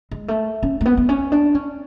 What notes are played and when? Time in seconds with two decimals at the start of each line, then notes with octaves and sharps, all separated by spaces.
0.11 G#3
0.28 A3
0.63 C#4
0.81 A3
0.86 B3
0.97 B3
1.09 C#4
1.32 D4
1.55 C#4